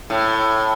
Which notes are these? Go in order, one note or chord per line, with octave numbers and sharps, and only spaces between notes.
A2